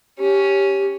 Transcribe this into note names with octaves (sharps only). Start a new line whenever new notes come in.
C#4 G4